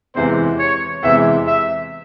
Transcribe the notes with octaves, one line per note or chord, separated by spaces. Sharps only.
E2 C3 E3 G#3 C4 C5
C#5
E2 C3 E3 G#3 C4 E5
E5